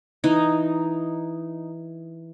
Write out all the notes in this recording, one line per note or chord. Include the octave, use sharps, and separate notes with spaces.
E3 D#4